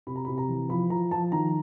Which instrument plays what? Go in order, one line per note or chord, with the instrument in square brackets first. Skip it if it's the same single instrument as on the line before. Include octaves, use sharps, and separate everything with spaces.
[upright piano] C3 B5
A#5
C3 B5
A#5
E3
F3 B5
F3 A#5
F3 A5
D#3 A#5